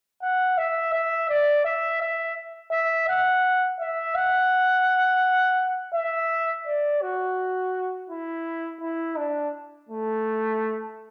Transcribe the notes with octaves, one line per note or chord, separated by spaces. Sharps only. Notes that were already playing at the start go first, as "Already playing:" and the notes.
F#5
E5
E5
D5
E5
E5
E5
F#5
E5
F#5
E5
D5
F#4
E4
E4
D4
A3